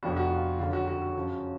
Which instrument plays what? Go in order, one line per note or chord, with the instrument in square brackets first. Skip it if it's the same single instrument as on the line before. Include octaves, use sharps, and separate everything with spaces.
[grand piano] F1 F2 F3 B3 D4 F#4
F#4
F4
F#1 F2 D3 F#3 F4
F#4
F#4
F#4
F#2 C#3 F3